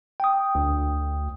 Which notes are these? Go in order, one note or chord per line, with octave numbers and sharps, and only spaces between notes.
G5 D#6
D2